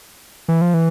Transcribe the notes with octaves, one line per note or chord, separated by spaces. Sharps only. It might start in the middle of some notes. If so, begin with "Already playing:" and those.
E3
F3
E3